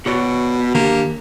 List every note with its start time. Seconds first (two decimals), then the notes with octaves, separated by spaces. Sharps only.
0.06 B2 F#4 C#5 D5
0.75 D#3 A#3 D4 G4